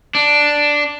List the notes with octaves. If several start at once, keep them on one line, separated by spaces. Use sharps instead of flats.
D4